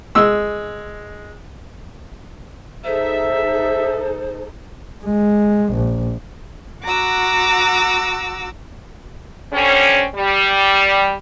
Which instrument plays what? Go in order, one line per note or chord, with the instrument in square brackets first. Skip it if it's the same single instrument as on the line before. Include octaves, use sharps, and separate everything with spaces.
[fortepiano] G#3 E6
[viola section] D#4 G#4 A4 [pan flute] C5 [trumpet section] E5
[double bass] G#3
A#1
[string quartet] F#4 F#5 A#5 D6 E6
[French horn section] D3 G3 C4 C#4
G3